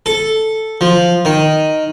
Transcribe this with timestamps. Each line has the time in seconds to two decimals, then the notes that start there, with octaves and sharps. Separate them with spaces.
0.06 A4
0.81 F3
1.25 D#3